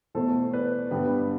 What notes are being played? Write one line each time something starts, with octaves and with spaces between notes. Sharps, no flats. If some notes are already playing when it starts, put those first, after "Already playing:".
E2 B2 A3 A4 C5
B4 D5
G2 D3 G3 B3 G4 B4